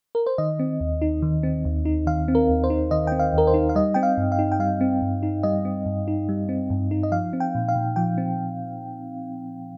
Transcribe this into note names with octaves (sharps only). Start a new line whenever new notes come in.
A#4
C5
D#3 D#5
C4
D#2
D#4
D#3
C4
D#2
D#4
D#3 F5
C4
A#4
D#2
C5
D#4
D#3 D#5
C4 G5
F5
D#2 A#4
C5
D#4
F5
G3 D#5
C4 G5
F5
G2
F5
D#4
G5
G3 F5
C4
G2
D#4
G3 D#5
C4
G2
D#4
G3
C4
G2
D#4
D#5
F3 F5
C4
G5
A#2
F5
A#2
F3 G5
C4